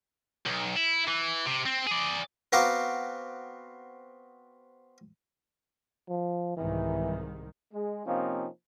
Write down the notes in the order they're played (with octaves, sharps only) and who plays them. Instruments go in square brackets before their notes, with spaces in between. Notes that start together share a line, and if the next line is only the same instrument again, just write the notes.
[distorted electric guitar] B1
E4
E3
C3
C4
G#4 D5
[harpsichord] B3 C4 F#4 F5 A#5 D6
[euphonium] F3
[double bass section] C2 G#2 D#3 [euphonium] E3
[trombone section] G#3
C3 F3 A#3 C4 C#4 D#4